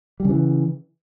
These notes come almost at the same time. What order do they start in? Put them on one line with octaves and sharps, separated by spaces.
G3 C#3 E3